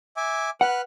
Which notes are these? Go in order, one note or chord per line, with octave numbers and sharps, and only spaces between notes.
E5 G#5 D6
B4 F#5 F6 F#6